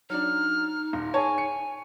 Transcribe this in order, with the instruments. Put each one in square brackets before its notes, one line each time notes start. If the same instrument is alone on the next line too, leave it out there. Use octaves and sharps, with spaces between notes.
[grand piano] F#3 D4 [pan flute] D#4 [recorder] F6
[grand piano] D#1
[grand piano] G#4 A5 [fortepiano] C#5 [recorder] G#5
[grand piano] C#7